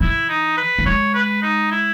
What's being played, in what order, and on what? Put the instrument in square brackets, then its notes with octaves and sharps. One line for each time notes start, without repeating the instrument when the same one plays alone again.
[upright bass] E3 [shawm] E4
[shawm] D#4
B4
[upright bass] A#3
[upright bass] G#3 [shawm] C#5
[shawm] B4
D#4
E4